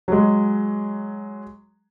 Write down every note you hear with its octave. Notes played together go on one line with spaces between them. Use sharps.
F#3 G#3